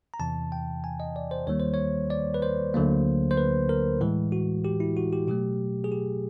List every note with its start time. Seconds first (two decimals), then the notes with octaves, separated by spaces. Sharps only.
0.14 A#5
0.20 E2 C3 E3 A5
0.52 G5
0.84 G#5
1.00 D#5
1.16 D5
1.31 C5
1.47 D#2 D#3 G3 A#3 C#5
1.60 C5
1.74 C#5
2.10 D5
2.34 B4
2.42 C5
2.74 D2 D3 F#3 A#3
3.31 C5
3.38 B4
3.69 A#4
4.01 A2 E3 G#3
4.32 F#4
4.65 G4
4.80 E4
4.97 F#4
5.13 G4
5.28 B2 F#3 A3 G4
5.84 G#4
5.92 G4